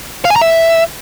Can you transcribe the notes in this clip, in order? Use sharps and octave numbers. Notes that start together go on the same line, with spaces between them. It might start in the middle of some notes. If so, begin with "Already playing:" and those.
F5
G#5
A#5
E5